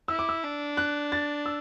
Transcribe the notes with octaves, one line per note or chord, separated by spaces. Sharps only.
E4 E6
D6
E6
D4
F#6
A6
E6